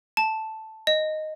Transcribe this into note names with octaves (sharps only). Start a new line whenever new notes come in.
A5
D#5